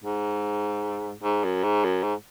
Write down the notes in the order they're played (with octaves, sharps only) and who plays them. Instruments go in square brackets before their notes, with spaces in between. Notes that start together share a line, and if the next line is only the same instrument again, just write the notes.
[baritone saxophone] G#2
G#2
F#2
G#2
F#2
G#2